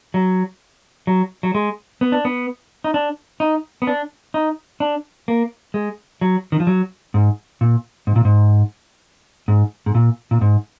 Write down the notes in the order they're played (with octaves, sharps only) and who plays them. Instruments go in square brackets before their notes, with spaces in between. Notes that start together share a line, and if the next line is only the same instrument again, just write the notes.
[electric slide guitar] F#3
F#3
F#3
G#3
B3
D4
B3
D#4
D4
D#4
B3
D4
D#4
D4
A#3
G#3
F#3
D#3
F3
F#3
G#2
A#2
G#2
A#2
G#2
G#2
G#2
A#2
A#2
G#2